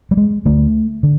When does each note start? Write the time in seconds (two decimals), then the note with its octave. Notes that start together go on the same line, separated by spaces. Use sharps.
0.11 G3
0.17 G#3
0.45 D2 D3 A3
1.03 D3